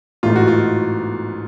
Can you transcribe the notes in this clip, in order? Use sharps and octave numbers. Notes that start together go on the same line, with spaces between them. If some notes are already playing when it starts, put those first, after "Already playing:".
A1 G#2 E3 A3 F4
F#4
F4